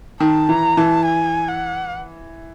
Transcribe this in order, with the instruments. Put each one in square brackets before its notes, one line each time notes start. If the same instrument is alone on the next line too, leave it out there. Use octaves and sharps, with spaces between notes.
[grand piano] D#3 [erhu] A5
[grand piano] E3 [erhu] A#5
[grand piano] E3 [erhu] A5
[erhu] G#5
F#5